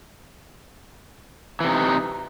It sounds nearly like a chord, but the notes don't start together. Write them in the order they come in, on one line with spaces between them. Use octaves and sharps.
E3 C3 D#4